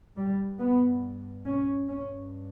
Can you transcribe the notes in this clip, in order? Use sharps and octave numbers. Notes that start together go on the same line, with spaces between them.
G2 G3
B3
C#4
G2 C#4